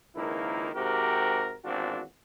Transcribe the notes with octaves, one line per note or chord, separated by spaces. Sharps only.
C#2 D#3 F3 A#3 E4
G#2 C3 F#4 G4 A#4
G#1 E2 C4 D4 F4 F#4